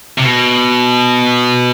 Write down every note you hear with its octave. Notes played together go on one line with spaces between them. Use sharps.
C3
B2